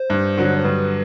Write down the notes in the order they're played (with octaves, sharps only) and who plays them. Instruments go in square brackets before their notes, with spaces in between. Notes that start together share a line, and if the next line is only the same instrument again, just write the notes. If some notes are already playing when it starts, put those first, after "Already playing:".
Already playing: [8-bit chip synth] C5
[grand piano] G2
D3 F#3
[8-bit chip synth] C5
[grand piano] G2 [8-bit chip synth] B4